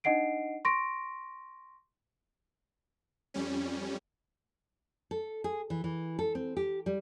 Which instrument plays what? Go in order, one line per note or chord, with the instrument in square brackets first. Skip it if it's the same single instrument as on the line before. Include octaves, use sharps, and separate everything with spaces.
[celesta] D4 D#4 D#5 F#5 C7 D7
C6 C#6 A#6 D7
[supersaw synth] F2 G3 C#4
[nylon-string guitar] A4
G#4
E3
E3
A4
C4
G4
G3